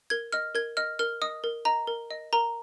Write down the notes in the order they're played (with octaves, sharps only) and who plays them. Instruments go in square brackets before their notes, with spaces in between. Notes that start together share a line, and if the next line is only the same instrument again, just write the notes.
[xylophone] A#4 G#6
D#5 F6
A#4 G#6
D#5 F6
A#4 F6
D#5 D#6
A#4
D#5 A#5
A#4
D#5
A#4 A#5